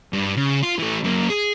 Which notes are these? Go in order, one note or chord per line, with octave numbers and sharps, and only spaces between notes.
G2
C#3
F4
E3 A3
F#2 A#3
G#4